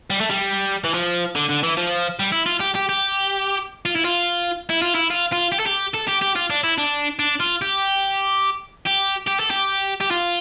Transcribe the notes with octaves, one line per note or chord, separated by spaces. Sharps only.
G3
A3
G3
E3
F3
D3
D3
E3
F3
G3
E4
F4
G4
G4
G4
F4
E4
F4
E4
F4
E4
F4
F4
G4
A4
G4
A4
G4
G4
F4
D4
E4
D4
D4
F4
G4
G4
G4
A4
G4
G4
F4